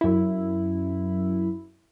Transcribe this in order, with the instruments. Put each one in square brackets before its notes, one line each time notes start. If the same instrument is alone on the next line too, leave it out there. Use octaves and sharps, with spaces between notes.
[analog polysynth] F#2 E4